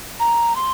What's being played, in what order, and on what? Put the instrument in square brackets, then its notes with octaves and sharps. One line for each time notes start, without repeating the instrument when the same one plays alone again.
[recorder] A#5
C6